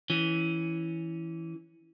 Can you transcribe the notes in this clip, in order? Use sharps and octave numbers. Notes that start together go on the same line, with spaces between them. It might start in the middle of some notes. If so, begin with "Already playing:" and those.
E3 C#4